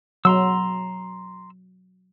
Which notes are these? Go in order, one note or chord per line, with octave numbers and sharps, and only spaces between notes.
F#3 A#5 C6 E6